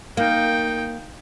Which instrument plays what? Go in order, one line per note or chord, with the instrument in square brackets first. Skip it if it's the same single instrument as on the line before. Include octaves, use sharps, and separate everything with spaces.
[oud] A#3 [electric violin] D#4 G5